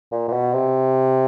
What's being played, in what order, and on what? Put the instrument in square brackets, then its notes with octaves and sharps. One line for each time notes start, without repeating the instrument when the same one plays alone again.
[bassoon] A#2
A#2
B2
C3